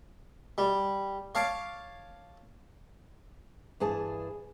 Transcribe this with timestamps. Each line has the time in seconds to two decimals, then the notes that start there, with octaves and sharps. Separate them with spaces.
0.58 G3
1.35 C#5 F5 A5 D6
3.80 G2 E3 D4 G#4 A5